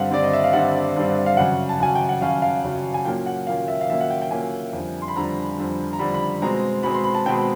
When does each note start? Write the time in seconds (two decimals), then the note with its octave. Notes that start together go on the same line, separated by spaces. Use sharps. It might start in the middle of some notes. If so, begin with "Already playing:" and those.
Already playing: G2 D3 G3 C4 F5 F#5
0.11 G2 D3 G3 C4 D5
0.24 D#5
0.33 E5
0.44 F5
0.53 G2 D3 G3 C4 F#5
0.96 G2 D3 G3 C4
1.26 F5
1.37 F#2 C#3 F#3 F#5
1.69 A5
1.79 F#2 C#3 F#3 G#5
1.95 G5
2.09 F#5
2.21 F#2 C#3 F#3 F5
2.42 F5
2.64 F#2 C#3 F#3
2.94 G#5
3.05 A#2 F#3 A#3 C#4 G5
3.26 F#5
3.47 A#2 F#3 A#3 C#4 F5
3.68 E5
3.81 F5
3.90 A#2 F#3 A#3 C#4 E5
4.00 F#5
4.10 G5
4.22 G5
4.31 A#2 F#3 A#3 C#4 G#5
4.73 F2 D3 G3
5.02 C6
5.08 B5
5.16 F2 D3 G3 A#5
5.58 F2 D3 G3
5.93 A#5
5.99 F2 D3 G3 B5
6.14 B5
6.42 B2 G#3 C4 A#5
6.83 B2 G#3 C4 B5
6.94 C6
7.04 B5
7.15 A5
7.26 B2 G#3 C4 G5